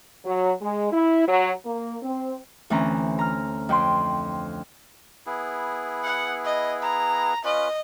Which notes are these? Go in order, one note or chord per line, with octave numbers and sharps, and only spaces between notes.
F#3
G#3
E4
F#3
A#3
C4
D2 E3 C4 C#4 A#5
A#5 F6
F2 G5 C6
B3 E4 G#4
F#5
D#5
A#5
C#4 F4 B4 D#5